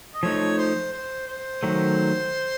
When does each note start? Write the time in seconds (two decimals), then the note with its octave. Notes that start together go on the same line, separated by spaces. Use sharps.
0.14 D#5
0.23 F3 A3 D#4 C#5
0.58 C5
0.93 C5
1.27 C5
1.63 D#3 F#3 A3